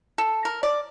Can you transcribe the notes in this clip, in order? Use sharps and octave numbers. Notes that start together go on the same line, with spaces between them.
A4
A#4
D5